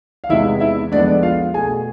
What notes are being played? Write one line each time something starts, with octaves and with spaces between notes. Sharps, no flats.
F5
E2 C3 G#3 B3 E4 E5
E4 E5
F2 D3 G#3 B3 D4 D5
F4 F5
B2 A3 G#4 G#5